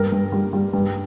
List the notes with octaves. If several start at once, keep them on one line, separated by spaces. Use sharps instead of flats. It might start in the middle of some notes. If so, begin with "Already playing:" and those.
Already playing: G2 A#4
G2
G3
G3
G2